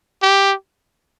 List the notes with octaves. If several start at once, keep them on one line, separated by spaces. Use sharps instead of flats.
G4